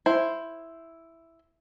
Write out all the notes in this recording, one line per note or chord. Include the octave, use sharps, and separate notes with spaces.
E4 C5